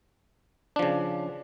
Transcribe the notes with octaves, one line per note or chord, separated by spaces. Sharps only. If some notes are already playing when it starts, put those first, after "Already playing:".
C#3 F3 D4